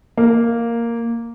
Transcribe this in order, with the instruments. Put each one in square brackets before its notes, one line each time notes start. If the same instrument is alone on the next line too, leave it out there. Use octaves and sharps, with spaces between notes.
[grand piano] A#3